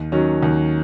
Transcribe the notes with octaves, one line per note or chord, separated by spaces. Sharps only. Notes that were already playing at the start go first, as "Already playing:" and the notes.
Already playing: D#2
D#3 F#3 C#4
D#2